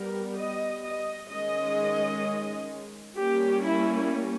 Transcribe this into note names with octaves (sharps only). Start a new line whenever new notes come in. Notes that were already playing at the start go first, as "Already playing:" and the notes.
Already playing: G3 B3 A#4
D#5
D#5
D#3 G#3 C#4 D#5
G3 A#3 C#4 G4
E4